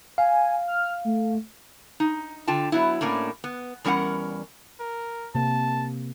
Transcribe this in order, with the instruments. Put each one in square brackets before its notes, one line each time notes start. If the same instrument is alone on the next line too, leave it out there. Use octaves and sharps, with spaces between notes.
[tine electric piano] F5 [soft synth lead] G#5
[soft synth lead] F6
A3
[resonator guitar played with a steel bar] D#4
D3 F4 G5 A5
F#3 B3 E4
A2 A#3 C#4 D4
B3
E2 G3 C#4 A#4 F#5
[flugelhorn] A#4
[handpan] C3 A#3 [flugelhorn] A5